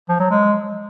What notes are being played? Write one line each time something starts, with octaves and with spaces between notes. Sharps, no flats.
F3
F#3
G#3